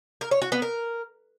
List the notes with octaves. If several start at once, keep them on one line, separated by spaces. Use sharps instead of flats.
A#4
C#5
F#4
B3
A#4